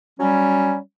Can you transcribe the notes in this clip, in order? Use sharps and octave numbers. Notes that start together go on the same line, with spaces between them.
F#3 G3 C#4